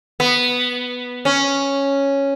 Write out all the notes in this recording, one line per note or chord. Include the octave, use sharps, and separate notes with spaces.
B3
C#4